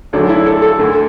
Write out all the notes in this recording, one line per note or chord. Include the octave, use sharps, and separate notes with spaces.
D2 D3 F#3 A3 D4
E4
A4
A4
D2 D3 A3